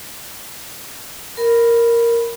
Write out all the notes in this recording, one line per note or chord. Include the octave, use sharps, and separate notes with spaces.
A#4 B5